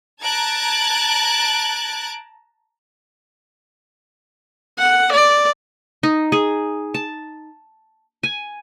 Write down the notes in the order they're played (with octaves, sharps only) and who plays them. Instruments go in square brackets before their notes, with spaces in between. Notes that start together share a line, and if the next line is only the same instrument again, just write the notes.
[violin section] A5 A#5 F#6 G#6 A6 D7
[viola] F#5
D5
[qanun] D#4
G#4
A5
G#5